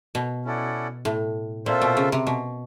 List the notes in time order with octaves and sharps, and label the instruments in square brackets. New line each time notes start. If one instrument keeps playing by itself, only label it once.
[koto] B2
[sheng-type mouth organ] C#4 E4 A4 D5 F#5
[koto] A2
[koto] A#2 [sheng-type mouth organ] C4 F4 A4 C5 E5
[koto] B2
C#3
C3
B2